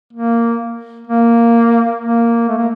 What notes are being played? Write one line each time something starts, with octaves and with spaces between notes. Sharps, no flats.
A#3
A#3
A#3
A3
A#3